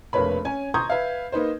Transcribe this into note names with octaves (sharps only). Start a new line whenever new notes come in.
F1 A#1 A#3 B4 C#5 B5
C#4 C#5 G#5
A#5 C6 C#6 D#6 G6 G#6
B4 E5 F5
A#3 D#4 B4 C5